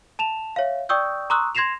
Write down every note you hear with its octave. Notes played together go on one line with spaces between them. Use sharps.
A5 E7 F7
C#5 E5 F5
D5 G5 C#6 D#6 E6 G6
A#5 C6 C#6 D#6 E6 F#6
C6 G#6 A#6 C7 E7 F7